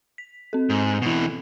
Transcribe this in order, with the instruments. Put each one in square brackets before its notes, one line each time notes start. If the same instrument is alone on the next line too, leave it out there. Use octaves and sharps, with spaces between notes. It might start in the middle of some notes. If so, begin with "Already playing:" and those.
[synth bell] B6
C4 A4
[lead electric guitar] G#2
B2 E3